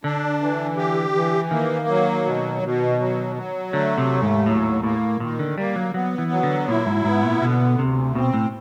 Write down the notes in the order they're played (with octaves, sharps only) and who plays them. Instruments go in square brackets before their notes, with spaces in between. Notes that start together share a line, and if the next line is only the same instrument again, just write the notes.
[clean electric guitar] D3 [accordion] D4
[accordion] E3
G4
E3
[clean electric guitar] D#3 [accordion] A#3
[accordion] F#3
B2
B2
F#3
F#3
[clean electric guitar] D3 [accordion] A3
[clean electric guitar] C3
[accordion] D#2
[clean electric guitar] G#2
[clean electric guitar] A2 [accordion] F#3
[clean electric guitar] A2 [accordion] A#3
[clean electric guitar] A#2 [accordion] D#3
[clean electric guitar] D3
[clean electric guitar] G3 [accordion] A#3
[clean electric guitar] F#3
[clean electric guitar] F#3 [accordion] B3
[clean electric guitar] E3
[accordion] F#3
[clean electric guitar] D3
[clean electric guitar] A#2 [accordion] E4
[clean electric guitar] G#2
[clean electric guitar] G#2 [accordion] B3
[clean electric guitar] A#2
[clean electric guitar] B2 [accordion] D3
[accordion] D2 [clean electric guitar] C3
[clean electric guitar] B2 [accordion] C4
[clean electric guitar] A2